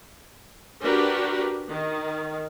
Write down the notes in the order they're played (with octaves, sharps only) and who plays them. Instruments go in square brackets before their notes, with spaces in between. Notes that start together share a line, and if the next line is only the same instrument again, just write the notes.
[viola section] D4 F#4 G4 A#4 B4
D#3